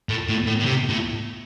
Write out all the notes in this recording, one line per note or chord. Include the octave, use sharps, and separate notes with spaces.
A2
A2
A2
A2
C3
A2